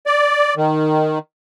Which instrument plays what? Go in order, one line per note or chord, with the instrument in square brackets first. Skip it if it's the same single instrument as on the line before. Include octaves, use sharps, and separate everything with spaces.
[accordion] D5
D#3